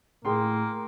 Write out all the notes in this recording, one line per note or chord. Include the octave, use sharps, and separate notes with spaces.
A2 A#3 G#4 G5 C6